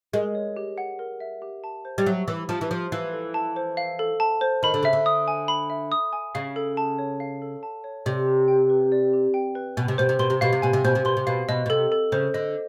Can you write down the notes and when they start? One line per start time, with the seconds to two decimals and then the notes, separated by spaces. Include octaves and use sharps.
0.13 G#3 A#4
0.35 C#5
0.57 G4
0.78 F#5
0.99 A#4
1.20 E5
1.42 G4
1.64 A5
1.85 C5
1.98 G3
2.06 F#3 E5
2.27 E3 G4
2.49 F3 A5
2.61 E3
2.70 F3 C5
2.92 E3 F5
3.13 A4
3.34 A5
3.56 C5
3.77 F5
3.99 A4
4.20 A5
4.41 C5
4.63 D#3 B5
4.74 D3
4.83 C#3 E5
4.93 D3
5.06 D#6
5.28 G#5
5.48 B5
5.70 E5
5.92 D#6
6.13 G#5
6.35 C#3 F5
6.56 A4
6.77 A5
6.99 C#5
7.20 F5
7.42 A4
7.63 A5
7.84 C#5
8.06 C3 D5
8.27 G4
8.48 G5
8.70 B4
8.92 D5
9.13 G4
9.34 G5
9.55 B4
9.77 B2 G#5
9.88 C3
9.98 B2 C5
10.09 C3
10.19 B2 C6
10.30 C3
10.41 B2 F5
10.53 C3
10.62 B2 G#5
10.73 C3
10.84 B2 C5
10.95 C3
11.05 B2 C6
11.17 C3
11.27 B2 F5
11.48 B2 D#5
11.66 B2
11.70 C3 A4
11.92 A4
12.12 C#3 C5
12.34 D3 D#5